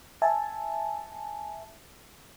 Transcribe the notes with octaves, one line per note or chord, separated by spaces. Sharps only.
E5 G#5 A5